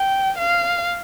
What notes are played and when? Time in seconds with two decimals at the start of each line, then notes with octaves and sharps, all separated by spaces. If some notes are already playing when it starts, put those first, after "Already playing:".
Already playing: G5
0.38 F5